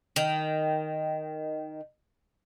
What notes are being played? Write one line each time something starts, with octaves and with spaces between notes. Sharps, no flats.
D#3 G5